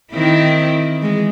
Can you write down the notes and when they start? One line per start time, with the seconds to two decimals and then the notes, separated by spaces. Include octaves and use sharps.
0.12 D#3 C4 E4
0.98 E3 G#3